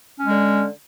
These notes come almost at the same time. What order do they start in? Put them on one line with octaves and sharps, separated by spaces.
C#4 G#3 D3